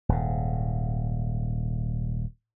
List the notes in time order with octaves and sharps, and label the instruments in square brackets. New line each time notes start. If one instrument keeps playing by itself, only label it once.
[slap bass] D#1 G#2